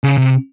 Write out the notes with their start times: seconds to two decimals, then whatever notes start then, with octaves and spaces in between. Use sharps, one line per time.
0.04 C#3
0.17 C3